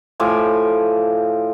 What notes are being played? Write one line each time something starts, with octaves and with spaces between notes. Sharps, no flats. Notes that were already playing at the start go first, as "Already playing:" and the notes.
A2 F3 G#5 D6